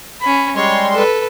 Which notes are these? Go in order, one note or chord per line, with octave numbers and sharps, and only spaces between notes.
C#4 B5
G3 G#3 C#5 C6
A4 B4